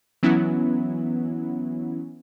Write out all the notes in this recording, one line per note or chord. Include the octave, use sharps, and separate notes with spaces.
E3 F#3 B3 C#4 E4